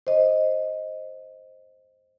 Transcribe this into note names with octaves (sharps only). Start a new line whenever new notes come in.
C5 D#5